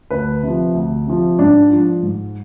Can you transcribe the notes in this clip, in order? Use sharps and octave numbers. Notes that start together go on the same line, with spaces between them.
D2 B4
C3 F3
D2
C3 F3
G#2 D4
F3
G#2